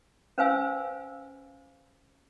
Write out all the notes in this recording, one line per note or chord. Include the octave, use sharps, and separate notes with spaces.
C#4 B4 C5 F5 G#5 E6